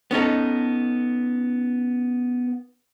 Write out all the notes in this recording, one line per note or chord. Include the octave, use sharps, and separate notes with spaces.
B3 C#4 D#4 A4